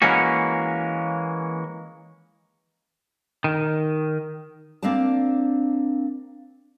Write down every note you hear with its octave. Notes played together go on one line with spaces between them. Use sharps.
E3 G#3 A#3 C#4 F#4
D#3
A#3 C4 D4 D5 A5